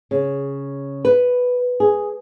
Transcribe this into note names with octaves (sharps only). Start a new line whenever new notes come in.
C#3
B4
G#4